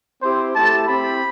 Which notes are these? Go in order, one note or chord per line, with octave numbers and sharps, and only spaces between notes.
C4 E4 G4 C5
A3 E4 G4 A5
C4 E4 G4 B5